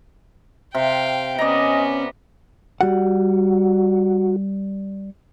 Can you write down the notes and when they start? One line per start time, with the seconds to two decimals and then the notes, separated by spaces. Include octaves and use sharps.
0.74 C3 F5 G5
1.38 B3 C#4 D5 D#5 A#5
2.81 G3 F#4 F#5